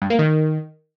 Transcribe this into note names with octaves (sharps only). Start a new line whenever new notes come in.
G2
A#3
D#3